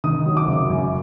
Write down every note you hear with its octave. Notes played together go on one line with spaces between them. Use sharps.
D#3 D#6
F#3
D6
F#1
F#2